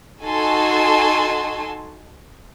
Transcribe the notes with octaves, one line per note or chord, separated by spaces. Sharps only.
D#4 F#4 A4 G#5 A5 C6